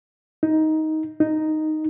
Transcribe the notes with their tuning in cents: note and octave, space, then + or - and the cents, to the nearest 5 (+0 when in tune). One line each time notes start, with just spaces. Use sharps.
D#4 +10
D#4 -5